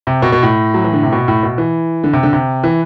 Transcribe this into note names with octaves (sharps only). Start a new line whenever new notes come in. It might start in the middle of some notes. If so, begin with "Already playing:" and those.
C3
B2
B2
A2
F#3
E3
D3
C3
B2
A2
B2
E3
D3
C3
D3
C3
E3